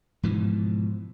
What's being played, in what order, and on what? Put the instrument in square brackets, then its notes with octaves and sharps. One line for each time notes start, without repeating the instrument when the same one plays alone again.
[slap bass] G#2 B2 E3 F3